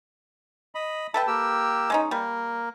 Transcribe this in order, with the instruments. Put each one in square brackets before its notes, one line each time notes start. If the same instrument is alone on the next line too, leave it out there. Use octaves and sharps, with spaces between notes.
[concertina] D#5 B5
[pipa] A4 B4 G5 [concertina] E5 A5
[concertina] A#3 G4 E6
[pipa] G#3 C#4 D#4
[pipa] G3 [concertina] A#3